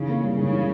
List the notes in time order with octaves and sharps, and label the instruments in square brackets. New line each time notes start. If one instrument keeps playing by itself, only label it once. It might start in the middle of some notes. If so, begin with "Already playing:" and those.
Already playing: [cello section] C#3 [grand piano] E3 D#4
[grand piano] A#3
G3
[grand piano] G#2 [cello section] C#3
[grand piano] E3